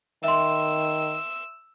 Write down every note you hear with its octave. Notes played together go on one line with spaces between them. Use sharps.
D#3 E5 C6 E6